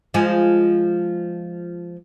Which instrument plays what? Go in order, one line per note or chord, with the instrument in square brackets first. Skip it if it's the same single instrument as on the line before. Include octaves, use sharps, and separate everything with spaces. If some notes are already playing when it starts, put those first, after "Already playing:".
[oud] F3 G#3